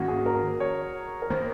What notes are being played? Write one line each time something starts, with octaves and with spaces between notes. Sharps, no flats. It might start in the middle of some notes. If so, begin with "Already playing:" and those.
Already playing: G#2 D#3 A#3 C#4 F#4
G#4
A#4
C#5
A#4
D#3 A#3 C5